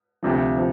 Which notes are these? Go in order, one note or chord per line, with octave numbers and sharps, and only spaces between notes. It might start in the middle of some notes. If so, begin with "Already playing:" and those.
D2 C3 F3
C3 F3